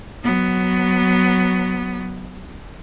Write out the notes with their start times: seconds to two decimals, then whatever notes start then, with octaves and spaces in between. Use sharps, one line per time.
0.23 F#3 B3